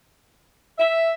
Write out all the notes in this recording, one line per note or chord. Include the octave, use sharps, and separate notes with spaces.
E5